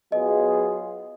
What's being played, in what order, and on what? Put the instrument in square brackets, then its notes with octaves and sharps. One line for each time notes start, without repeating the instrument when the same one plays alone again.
[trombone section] F#3 B3 F4 G#4 [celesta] D#5